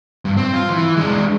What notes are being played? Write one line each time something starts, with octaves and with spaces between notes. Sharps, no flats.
G2
C4
F4
E3
G#3 D4